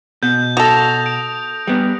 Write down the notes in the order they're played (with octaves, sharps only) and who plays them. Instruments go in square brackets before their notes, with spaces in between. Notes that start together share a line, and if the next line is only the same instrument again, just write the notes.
[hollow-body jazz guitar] B2 [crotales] G6
[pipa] F#4 A4 [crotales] D#6 A#6 F7
[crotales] D7
[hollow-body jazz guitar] G3 B3